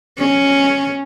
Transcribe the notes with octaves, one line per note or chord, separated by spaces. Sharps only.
C#4